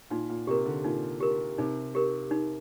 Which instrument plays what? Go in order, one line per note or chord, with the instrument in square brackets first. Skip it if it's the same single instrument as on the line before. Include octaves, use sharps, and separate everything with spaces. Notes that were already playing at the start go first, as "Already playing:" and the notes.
[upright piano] A#2 [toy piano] D#4
[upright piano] A#2
[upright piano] C3 [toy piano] G4 A#4
[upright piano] D3
[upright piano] A#2 [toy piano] D#4
[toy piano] G4 A#4
[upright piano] C3 [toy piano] D#4
[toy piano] G4 A#4
D#4